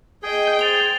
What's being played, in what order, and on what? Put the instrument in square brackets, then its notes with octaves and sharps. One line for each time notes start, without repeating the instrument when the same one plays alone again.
[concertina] G#4 [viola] D#5 G5
[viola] C5 [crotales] A6 F7 G7